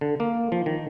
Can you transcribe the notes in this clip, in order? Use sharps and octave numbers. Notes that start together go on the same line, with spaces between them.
D3
A#3
F3
D#3